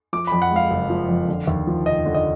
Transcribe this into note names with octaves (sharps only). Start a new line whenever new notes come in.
F3 D6
F2 B5
F#5
G#3 F5
F#1
F3
F2
D3
D#2
F3
F1 D#5
D3
D#5